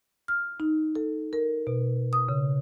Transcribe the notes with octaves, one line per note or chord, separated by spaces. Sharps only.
F6
D#4
A4
A#4
B2
D#6
C#3